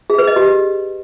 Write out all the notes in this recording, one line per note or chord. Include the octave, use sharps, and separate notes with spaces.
G#4
B4
D#5
G4